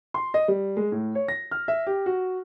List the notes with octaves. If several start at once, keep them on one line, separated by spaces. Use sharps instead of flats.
C6
D#5
G3
G#3
A2
C#5
A#6
F6
E5
G4
F#4